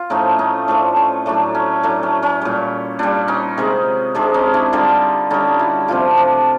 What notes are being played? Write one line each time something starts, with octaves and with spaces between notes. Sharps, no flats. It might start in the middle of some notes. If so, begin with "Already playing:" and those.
Already playing: F4
A2 F3 A3 C#4 D#4
C#4 D#4
A2 F3 A3 D4
C#4
A2 F#3 A3 D4
C#4
A2 F#3 A3 D4
C#4
C#4
A#2 G3
A#2 G3 D4
C#4 D#4
C3 D#3 G#3
C3 D#3 G#3 D4
C#4 D#4
D4 E4
D3 G3 D#4 F4
D3 G3 C#4 D#4
E4 F#4
C3 F3 A3 F4 G4
D4